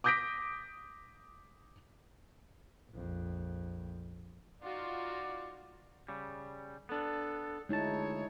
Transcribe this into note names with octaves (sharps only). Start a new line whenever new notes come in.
D6 D#6 G6 A#6 B6 D7
A#1 F2
D#4 F4 F#4 D5
C#3 G3
B3 D4 A4
D2 G#3 D#4 E4 C#5 A5